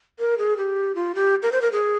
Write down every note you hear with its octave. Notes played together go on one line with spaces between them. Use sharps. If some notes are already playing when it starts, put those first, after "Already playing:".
A#4
G#4
G4
F4
G4
A#4
C5
A#4
G#4